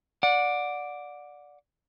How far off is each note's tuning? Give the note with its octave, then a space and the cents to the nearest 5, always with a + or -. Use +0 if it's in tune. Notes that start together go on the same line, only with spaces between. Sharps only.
D5 +0 F#5 -25